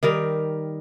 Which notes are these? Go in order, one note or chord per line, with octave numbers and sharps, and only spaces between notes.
D#3 G3 A#4